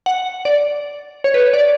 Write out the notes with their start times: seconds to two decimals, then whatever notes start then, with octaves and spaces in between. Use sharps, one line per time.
0.06 F#5
0.45 D5
1.24 C#5
1.34 B4
1.53 D5